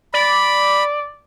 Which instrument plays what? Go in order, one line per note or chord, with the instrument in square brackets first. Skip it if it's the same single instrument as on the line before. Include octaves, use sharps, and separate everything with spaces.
[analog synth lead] D5 [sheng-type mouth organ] B5